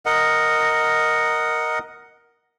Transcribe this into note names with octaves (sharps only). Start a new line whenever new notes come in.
A#4 D#5 F#5